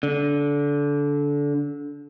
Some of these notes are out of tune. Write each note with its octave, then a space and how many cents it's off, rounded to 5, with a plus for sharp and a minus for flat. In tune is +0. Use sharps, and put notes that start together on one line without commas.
D3 -20